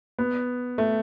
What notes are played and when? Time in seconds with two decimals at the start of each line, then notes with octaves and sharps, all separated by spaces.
0.19 B3
0.78 A3